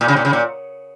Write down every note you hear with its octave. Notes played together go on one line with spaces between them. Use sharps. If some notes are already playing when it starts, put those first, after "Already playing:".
A#2
C#3
A#2
C#3
A#2